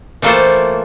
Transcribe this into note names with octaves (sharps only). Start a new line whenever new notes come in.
E3 A3 A#3 F4 A4 C5